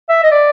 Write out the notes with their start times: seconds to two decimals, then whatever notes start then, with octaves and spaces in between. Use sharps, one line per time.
0.09 E5
0.23 D#5
0.31 D5